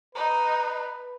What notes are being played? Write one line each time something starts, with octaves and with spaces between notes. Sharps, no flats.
D#4 B4